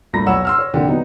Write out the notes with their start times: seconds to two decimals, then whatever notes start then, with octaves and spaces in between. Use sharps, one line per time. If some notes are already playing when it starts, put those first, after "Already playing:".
0.13 G2 A#2 A3 A#5 B5 A#6
0.26 B1 C#5 F#5 B5 E6 E7
0.45 C6 E6 F6
0.58 C#5
0.74 A#2 D3 D#3 C4 G4
0.88 F#3 B3 D#4